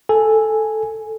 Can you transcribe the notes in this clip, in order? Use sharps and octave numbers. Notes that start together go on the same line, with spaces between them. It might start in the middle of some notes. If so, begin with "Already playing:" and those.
A4 G#5